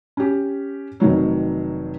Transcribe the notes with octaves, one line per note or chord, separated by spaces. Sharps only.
C#4 G4
F1 D#3 F#3 C#5